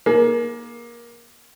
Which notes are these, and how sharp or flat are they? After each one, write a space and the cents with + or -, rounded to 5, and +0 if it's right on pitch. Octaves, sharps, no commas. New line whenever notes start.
A#3 +20 G#4 +40